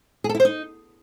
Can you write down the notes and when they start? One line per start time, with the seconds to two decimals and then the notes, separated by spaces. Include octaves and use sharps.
0.24 G#4
0.29 A4
0.35 E4
0.40 C5
0.45 D#4